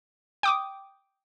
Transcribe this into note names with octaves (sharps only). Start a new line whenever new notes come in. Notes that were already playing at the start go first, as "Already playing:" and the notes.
G5 D6 D#6